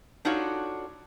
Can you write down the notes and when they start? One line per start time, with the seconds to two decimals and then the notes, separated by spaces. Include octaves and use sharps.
0.25 D4 D#4 F4 F#4 A4 C#5